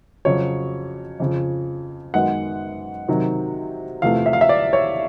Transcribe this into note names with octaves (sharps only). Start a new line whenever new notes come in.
F2 C#3 F#3 C#5
F2 C#3 F3
F#2 D#3 G#3 B3 F#5
C3 D#3 F#3
E2 C3 F3 A3 F5
E5
F5
E5
D5
C#5